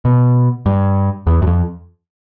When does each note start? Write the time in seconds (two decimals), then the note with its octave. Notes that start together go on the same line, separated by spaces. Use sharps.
0.05 B2
0.66 G2
1.27 E2
1.42 F#2
1.47 F2